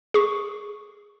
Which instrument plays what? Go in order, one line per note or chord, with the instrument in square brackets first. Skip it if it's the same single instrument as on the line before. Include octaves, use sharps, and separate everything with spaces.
[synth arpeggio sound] G#4 C#6